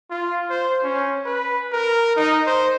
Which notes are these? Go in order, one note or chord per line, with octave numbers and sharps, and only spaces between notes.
F4
C5
C#4
B4
A#4
D#4
C5